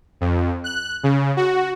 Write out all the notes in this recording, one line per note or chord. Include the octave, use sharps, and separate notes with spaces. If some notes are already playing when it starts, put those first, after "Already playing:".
F2
F#6
C#3
F#4